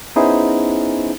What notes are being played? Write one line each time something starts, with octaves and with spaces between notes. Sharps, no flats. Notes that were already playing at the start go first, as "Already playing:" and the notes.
B3 C#4 D#4 E4 G#4 C5